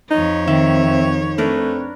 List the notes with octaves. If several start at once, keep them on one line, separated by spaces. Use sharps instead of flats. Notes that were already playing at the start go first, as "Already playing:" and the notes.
F2 D#4 C#5
D#3 C4 E5
A3 C4 D4 A#4 B4